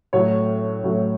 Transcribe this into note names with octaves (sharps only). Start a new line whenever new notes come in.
A2 F#3 A3 C#5
A2 F#3 A3